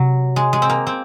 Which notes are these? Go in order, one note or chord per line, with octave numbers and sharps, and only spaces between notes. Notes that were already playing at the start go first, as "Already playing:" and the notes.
Already playing: C3 F#3
G#3
G#3
C4
A#3
C4